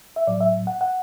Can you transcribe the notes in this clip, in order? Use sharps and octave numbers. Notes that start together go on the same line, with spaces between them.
E5
A2 F#3 D5
E5
F#5
F#5